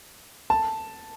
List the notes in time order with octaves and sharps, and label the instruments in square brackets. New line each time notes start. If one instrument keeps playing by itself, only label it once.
[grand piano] A5